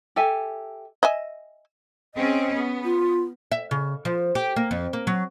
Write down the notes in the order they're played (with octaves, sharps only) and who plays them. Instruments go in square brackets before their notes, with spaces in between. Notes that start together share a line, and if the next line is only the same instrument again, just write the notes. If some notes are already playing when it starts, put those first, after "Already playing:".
[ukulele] G4 A4 E5 G#5
[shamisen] D#5 E5 G#5
[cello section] C4 C#4 G#4 [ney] D#5
[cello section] B3
[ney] F4
[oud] E5
C#3
F3
G4
A#3
F2
A#3
F#3